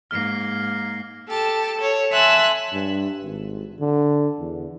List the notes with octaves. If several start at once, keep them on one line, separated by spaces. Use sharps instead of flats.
G#2 A#3 F6 C7
G4 A4 A5
A4 C#5
E5 G#5 A5 C6 E6 F#6
G2
G#1
D3
E2